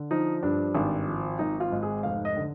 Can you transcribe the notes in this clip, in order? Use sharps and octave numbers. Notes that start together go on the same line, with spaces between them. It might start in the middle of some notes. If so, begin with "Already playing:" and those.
Already playing: D3
F3 D#4
G2 D4
G#1
F3
G#1 D#4
F4
G#2
G#4
F1 F5
D#5
D3